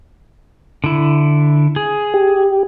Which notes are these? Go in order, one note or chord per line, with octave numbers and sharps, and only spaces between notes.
D3 E4
G#4
G4